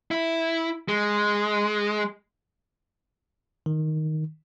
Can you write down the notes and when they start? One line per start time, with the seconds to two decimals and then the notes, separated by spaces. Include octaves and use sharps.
0.11 E4
0.88 G#3
3.66 D#3